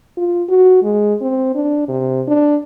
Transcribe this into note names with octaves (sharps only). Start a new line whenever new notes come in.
F4
F#4
G#3
C4
D4
C3
D4